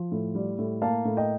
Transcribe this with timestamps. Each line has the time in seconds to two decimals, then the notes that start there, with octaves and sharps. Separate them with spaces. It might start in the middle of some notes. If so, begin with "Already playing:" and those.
Already playing: F3
0.12 A2
0.35 G3
0.59 A2
0.82 A#3 F5 A5
1.05 A2
1.17 D#5 G5